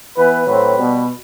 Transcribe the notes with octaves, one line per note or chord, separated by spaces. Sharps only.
E3 B3 B4
A2 F#3 C4 B4
B2 G3 B3